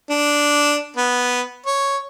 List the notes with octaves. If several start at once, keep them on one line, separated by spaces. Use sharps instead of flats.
D4
B3
C#5